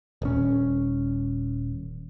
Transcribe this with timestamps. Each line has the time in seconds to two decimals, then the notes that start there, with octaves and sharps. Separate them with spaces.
0.22 D#1 C#4